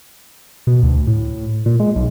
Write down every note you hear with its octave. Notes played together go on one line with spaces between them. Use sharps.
B2
D2
A2
A#2
G#3
B1